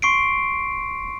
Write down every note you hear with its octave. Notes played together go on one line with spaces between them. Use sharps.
C6 C#6 C7 D7